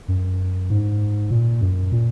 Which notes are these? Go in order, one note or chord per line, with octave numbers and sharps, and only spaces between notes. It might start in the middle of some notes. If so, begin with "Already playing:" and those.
F#2
G#2
A#2
F#2
A#2